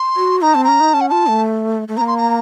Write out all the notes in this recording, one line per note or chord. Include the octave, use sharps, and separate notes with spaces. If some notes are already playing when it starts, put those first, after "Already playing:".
Already playing: C6
F#4
D#4 A#5
C4 A5
C#4 A#5
D#4
C#4 A5
F#5
F4 A5
A3
A3
A#3 C4 A#5
C6
A#5